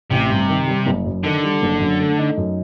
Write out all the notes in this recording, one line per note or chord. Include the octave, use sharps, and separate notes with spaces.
A1 C3
G2
D#3
G3
F#1
F#2
D3 D#3
G3
F#1
F#2
A3
D#4
F#2